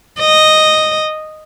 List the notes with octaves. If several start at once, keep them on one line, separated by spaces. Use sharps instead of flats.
D#5